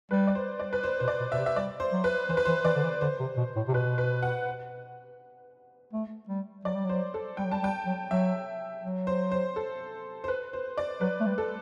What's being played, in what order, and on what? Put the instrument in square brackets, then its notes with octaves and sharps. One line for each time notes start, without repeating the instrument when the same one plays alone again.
[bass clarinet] G3 [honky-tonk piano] B4
[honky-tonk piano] D5
C5
D5
B4
C5
[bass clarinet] B2 [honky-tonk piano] C5
[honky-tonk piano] D5
[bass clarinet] B2
[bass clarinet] B2 [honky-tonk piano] E5
[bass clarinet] C3
[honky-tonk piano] E5
[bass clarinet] G3 [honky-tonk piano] D5
[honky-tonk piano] C5
[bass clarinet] F#3
[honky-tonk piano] B4
[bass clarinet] E3 [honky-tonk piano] C5
[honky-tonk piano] B4
[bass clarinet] E3 [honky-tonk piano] C5
[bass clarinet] E3 [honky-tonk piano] D5
[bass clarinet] D3
E3
[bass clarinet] D3 [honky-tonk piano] C5
[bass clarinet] C3
B2
A2
C3
[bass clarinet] B2 [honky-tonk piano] B4
[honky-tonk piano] B4
F#5
[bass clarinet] A3
G3
[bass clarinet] F#3 [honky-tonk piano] D5
[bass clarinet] G3
[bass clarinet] F#3 [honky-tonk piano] C5
[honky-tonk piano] A4
[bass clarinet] G3 [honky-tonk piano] G5
[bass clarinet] F#3
[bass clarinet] G3 [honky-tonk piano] A5
[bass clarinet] G3 [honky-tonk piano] G5
[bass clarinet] F#3
[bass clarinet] F#3 [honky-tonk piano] E5
[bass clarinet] F#3
[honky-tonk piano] C5
C5
A4
C5
B4
C5
D5
[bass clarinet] F#3 [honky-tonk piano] B4
[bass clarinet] A3
G3
[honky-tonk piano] A4